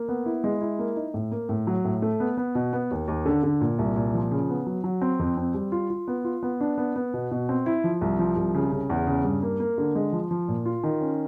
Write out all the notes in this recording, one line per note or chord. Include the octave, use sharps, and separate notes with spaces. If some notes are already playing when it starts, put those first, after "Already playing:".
Already playing: A#3
B3
E4
G#3
E4
A#3
D#4
A2
A#3
A2
F#3
A2
A3
B3
B3
B2
B3
D#2
D#2
D3
D3
A#2
C2
A#2
F3
C#3
B3
F#3
F#3
C4
F2
C4
G3
F4
F4
B3
F4
B3
D4
B3
B3
B2
B2
C4
E4
F3
C2
F3
C2
C#3
C#3
E2
C#3
G2
A#3
A#3
D3
G#3
F3
F3
A#2
F4
D#3
C#4